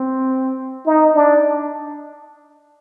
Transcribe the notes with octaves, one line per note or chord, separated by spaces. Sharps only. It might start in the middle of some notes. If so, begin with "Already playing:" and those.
Already playing: C4
D#4
D4